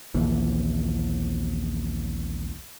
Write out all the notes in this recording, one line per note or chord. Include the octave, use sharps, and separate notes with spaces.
A#1 D#2 E3